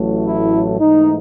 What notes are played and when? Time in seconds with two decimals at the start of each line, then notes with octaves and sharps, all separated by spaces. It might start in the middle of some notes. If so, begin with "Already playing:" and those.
Already playing: A1 A2 F#3 A3
0.27 E4
0.79 G#2 E3 A3 D#4